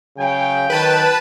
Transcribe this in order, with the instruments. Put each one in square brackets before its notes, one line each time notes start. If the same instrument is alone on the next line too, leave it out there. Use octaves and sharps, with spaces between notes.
[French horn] C#3 [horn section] F#3 G5
[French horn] D#3 [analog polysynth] B4 A5